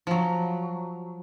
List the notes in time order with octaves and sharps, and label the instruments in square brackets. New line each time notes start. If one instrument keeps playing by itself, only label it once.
[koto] F3 F#3